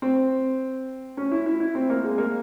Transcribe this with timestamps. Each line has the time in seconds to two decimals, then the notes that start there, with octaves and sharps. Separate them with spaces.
0.02 C4
1.17 C#4
1.32 E4
1.46 E4
1.60 E4
1.75 C4
1.90 A#3
2.04 G#3
2.18 A#3